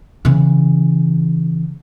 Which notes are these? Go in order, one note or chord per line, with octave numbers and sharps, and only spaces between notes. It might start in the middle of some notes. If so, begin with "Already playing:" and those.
C#3 E3